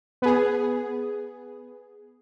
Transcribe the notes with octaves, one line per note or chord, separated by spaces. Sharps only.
B3 G#4